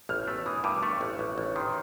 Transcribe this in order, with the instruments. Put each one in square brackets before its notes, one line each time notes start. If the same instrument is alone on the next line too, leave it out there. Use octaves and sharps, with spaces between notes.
[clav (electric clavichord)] A1 [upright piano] F6
[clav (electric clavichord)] A3 [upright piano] E6
[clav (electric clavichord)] E3 [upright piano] D#6
[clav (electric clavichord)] G2 [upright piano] D6
[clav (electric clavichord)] A3 [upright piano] C#6
[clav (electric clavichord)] A1
A1
A1
[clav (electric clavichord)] D#3 [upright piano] C6